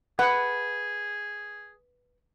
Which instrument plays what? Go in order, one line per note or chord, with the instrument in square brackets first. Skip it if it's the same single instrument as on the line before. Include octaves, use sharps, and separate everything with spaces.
[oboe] G#4 [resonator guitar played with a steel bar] B4 [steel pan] F#5